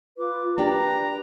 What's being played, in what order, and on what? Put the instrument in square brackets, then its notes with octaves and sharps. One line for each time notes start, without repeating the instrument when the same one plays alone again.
[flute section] F4 B4 D6
[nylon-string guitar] A#3 D4 G4 [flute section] B4 G5 [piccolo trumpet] A#5